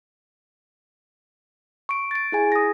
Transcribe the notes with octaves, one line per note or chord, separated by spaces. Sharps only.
C#6 D7
A6 D7
E4 G#4 G#5
D#6 A#6